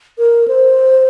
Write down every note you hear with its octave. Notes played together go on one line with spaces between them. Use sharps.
A#4
C5